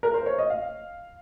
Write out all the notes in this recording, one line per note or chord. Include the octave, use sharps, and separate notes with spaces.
A#4
C5
C#5
D#5
F5